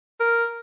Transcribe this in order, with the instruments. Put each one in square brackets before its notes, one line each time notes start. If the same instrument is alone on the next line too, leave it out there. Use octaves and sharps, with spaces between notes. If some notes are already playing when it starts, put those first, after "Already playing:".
[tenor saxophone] A#4